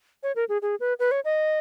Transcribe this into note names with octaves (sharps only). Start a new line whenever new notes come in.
C#5
A#4
G#4
G#4
B4
B4
C#5
D#5